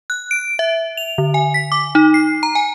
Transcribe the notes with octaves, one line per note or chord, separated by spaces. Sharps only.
F#6
D7
E5
F7
D3
G#5
B6
D6
D#4
C7
A#5
G#5